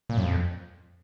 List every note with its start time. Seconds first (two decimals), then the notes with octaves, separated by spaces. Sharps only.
0.09 A#2
0.17 F#2
0.23 F2